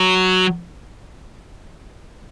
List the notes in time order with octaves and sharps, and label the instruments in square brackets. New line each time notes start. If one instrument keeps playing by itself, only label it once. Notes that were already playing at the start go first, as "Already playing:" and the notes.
Already playing: [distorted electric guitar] F#3